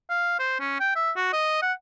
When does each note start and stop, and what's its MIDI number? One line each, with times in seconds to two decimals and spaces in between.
0.10 0.38 77
0.39 0.60 72
0.60 0.77 61
0.80 0.91 79
0.96 1.11 76
1.16 1.30 66
1.33 1.61 75
1.62 1.73 78